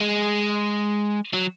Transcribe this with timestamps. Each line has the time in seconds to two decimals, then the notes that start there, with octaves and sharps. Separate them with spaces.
0.01 G#3
1.33 F#3